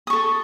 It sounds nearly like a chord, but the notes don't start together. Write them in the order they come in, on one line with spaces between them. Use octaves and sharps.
D#6 C#6 A4